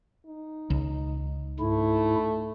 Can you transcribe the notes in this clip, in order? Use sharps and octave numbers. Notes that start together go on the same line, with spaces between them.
D#4
C#2
G#2 A3 E4